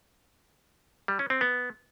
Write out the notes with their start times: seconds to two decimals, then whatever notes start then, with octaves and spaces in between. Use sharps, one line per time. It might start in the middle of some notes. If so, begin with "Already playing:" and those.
1.08 G3
1.19 C#4
1.30 C4
1.41 B3